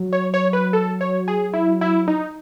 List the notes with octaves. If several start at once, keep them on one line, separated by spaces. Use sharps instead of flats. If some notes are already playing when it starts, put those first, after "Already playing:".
Already playing: F#3
C#5
C#5
B4
A4
C#5
G#4
E4
E4
D#4